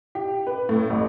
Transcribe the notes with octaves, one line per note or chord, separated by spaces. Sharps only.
G4
B4
A2
A1